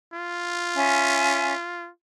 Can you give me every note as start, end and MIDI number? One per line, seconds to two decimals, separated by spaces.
0.14 1.90 65
0.76 1.53 61
0.76 1.53 76
0.76 1.53 80